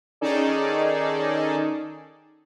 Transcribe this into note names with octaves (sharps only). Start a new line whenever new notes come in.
D#3 C#4 D#4 G#4 A4 D5